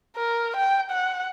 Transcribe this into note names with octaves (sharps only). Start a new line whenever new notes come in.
A#4
G5
F#5